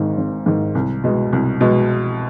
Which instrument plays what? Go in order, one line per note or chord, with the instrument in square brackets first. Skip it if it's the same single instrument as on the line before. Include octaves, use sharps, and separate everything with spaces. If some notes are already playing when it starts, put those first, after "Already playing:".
Already playing: [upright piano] G#1 G#2 D#3
G#1
G#2 D#3
C2
B2 G#3
C2
B2 G#3